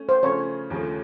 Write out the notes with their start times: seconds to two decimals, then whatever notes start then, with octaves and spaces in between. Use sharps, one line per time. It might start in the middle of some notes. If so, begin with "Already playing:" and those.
Already playing: A3 C#4
0.09 C5
0.23 C#3 F3 A3 C#4 C#5
0.70 D#2 C#3 F3 A3